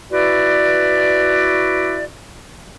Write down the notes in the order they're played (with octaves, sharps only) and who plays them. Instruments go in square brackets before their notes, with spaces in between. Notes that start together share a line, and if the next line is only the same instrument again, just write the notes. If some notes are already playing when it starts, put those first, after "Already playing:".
[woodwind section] E4 F#4 B4 D5